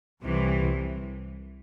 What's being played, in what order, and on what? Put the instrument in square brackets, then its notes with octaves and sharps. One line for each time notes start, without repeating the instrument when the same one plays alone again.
[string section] C2 C3 E3